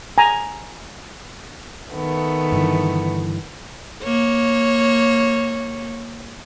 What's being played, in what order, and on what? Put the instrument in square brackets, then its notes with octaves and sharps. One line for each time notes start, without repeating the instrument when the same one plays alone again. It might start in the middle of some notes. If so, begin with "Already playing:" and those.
[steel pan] G#5 A#5
[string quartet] D#3 A3 B3
[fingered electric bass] G2 D3 E3
[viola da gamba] A#3 C#5